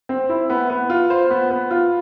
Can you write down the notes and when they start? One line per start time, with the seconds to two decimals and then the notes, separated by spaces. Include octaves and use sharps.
0.09 C4
0.29 E4
0.50 B3
0.70 B3
0.90 F4
1.10 C5
1.30 B3
1.50 B3
1.71 F4